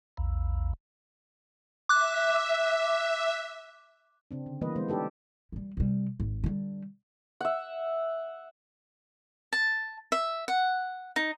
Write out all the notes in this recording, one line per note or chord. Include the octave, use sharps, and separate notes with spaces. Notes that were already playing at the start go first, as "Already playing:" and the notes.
A#1 E2
E5 D6 F#6
C#3 C4 D4
D3
E3 G3 A#3 B3 B4 D#5
E3 G#3 B3 C4 C5
D4 D#4 G4 A4 B4
E3 G3
C3 G3
G#1
D3 G3
E5 F#5
A5
E5
F#5
D#4